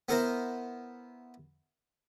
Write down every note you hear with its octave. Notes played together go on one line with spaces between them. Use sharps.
B3 E4 A#4 C5 E5 A#5